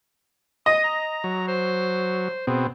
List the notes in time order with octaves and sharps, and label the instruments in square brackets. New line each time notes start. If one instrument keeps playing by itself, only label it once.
[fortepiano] D#5 [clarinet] D#6
[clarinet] A#5
[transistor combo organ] F#3
[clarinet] C5
[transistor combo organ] B2 C4 [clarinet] G#4